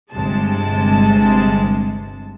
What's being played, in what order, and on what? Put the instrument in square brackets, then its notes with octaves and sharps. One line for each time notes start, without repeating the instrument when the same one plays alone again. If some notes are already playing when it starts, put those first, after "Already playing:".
[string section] G1 C3 G#3 A5